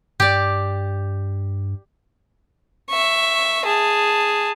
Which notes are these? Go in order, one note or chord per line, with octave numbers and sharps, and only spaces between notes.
G2 G4 D5
E5 C#6
G#4 A5